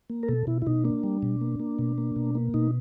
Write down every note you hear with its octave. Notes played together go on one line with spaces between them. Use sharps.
A#3
A#4
B2 A4
B2 E4
E4
B2 D#4
A#3 D4
G3
B2
A#3
A#3
B2
A#3
B2
A#3
B2 D#4